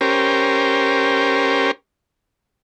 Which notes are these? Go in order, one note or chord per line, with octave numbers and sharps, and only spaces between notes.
C#4 G4 A#4 C5